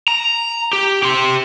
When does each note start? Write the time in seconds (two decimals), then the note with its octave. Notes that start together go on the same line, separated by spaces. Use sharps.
0.08 A#5
0.73 G4
1.03 G4 C6